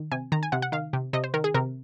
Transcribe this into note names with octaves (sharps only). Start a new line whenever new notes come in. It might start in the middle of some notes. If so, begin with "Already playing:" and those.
Already playing: D#3
C3 G#5
D#3 A#5
G#5
C3 F#5
F#5
D#3 F5
C3
C3 D#5
C5
D#3 A#4
G#4
C3 A#4